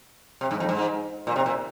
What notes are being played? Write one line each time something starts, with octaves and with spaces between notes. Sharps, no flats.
C3
G#2
F2
G#2
A#2
C3
A#2